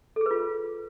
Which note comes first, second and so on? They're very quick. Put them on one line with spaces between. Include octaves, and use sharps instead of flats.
A4 G#4 B4 F4